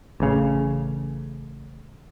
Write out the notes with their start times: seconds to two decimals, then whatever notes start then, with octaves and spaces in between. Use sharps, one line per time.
0.20 A1 C#3